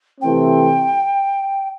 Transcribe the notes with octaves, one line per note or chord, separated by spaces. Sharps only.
C3 E3 A3 C4 G5